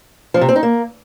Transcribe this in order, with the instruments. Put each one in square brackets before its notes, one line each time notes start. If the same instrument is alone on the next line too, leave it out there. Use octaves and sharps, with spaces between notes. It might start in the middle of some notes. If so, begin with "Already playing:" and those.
[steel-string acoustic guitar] F3
C3
C4
D#4
A#3